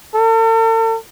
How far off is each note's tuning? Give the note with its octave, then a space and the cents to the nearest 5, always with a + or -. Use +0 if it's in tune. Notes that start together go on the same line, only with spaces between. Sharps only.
A4 +45